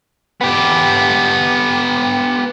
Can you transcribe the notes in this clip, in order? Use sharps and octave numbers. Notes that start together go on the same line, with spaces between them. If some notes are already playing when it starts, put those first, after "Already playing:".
B3 G4